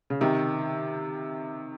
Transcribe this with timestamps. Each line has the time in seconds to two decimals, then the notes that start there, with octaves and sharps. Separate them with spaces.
0.10 C#3
0.21 C3 D#3